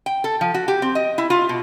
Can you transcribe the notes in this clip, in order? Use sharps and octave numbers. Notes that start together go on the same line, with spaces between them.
G5
A4
F3
F#4
G4
C4
D#5
E4
F4
B2